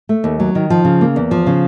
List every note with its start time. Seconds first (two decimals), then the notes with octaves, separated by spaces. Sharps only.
0.09 A3
0.24 D#2
0.40 F#3
0.55 D#3
0.70 F3
0.85 C#3
1.01 A#3
1.16 E2
1.31 F3
1.47 C#3